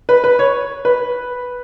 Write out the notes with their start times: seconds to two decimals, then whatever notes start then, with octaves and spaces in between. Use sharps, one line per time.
0.09 B4
0.24 B4
0.39 C#5
0.85 B4